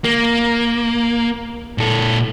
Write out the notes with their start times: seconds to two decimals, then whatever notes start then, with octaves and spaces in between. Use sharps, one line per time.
0.04 A#3
1.78 A#2 A4